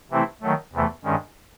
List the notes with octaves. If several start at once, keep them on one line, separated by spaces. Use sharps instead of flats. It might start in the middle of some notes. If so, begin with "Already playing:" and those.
C3 E3 A3 C4 E4
D#3 F#3 A3
E2 C3 E3 A3
G2 D#3 G#3 C#4